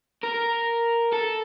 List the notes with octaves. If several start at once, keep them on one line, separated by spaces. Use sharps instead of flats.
A#4
A4